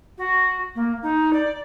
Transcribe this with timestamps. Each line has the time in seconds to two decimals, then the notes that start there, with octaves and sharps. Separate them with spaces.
0.18 F#4
0.75 A#3
1.02 D#4
1.33 D5